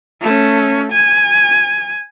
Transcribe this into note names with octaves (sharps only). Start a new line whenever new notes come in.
A3 C#4
G#5